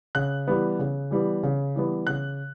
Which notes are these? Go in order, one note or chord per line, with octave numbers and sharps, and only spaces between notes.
C#3 F#6
E3 G3 B3
C#3
E3 G3 B3
C#3
E3 G3 B3
C#3 F#6